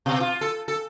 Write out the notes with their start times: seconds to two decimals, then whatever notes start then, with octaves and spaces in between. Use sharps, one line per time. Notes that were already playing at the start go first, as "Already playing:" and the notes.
0.06 B2
0.20 F4
0.41 A4
0.68 A4